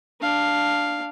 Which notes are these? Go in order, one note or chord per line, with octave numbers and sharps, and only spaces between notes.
D4 F5